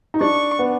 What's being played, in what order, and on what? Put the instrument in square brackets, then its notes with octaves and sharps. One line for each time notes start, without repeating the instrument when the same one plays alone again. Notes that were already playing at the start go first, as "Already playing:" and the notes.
[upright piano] D#4
[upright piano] D4 [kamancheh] C#6
[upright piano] B3